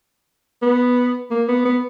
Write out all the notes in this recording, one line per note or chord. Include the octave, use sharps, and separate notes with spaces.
B3
A#3
B3
B3